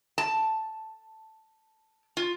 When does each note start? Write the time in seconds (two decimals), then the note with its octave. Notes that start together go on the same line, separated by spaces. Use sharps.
0.18 A5
2.17 F4